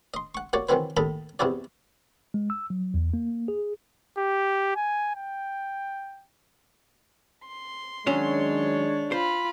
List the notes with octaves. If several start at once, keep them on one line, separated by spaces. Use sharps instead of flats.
D#5 C6
F#5 C#6
A#3 F#4 C#5 D5 C#6
D#3 E3 F#3 C4 E4 B4
D#2 A2 D#4 A4 A#5 B5
E2 C3 D#4 E4 F#4 D5
G#3
E6
F#3
E2
A#3
G#4
G4
G#5
G5
C6
D#3 F#3 G#3 C#4 D4 F#4 C#5
F4 C5 B5